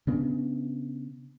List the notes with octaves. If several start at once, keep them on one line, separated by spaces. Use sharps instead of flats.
C#3 B3 D4